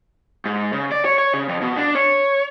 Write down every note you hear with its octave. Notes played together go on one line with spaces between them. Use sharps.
G#2
C#3
D5
C#5
C#5
C#3
F2
B2
D4
C#5